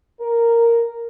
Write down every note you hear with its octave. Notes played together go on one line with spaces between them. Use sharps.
A#4